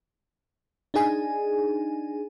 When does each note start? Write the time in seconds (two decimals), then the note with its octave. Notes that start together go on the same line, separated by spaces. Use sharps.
0.94 D4 D#4 G#4 G#5